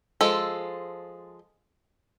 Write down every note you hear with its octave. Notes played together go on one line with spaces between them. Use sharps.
F3 G#3 A4